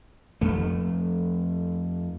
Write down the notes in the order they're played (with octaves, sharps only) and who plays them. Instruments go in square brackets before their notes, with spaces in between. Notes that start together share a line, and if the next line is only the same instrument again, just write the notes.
[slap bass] F2 A3